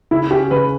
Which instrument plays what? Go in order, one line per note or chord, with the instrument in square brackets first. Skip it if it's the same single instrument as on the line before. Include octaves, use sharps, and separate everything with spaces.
[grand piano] C#3 [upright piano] E4
[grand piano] C#4 [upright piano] G4
[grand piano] C#3 [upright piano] B4